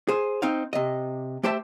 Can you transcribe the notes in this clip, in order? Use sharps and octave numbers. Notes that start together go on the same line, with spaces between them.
G#4 C5
C4 D#4 F5
C3 D#5
A3 G4 C5 E5 A5